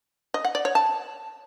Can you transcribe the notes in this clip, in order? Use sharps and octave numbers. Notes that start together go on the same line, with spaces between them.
D#5
F#5
D5
C#5
A5